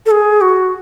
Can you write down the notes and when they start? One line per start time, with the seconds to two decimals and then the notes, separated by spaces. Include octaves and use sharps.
0.06 A4
0.11 G#4
0.41 F#4